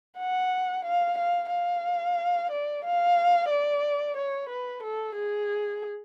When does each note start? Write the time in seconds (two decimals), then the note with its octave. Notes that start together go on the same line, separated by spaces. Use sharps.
0.18 F#5
0.85 F5
1.18 F5
1.51 F5
2.51 D5
2.85 F5
3.50 D5
4.17 C#5
4.49 B4
4.83 A4
5.16 G#4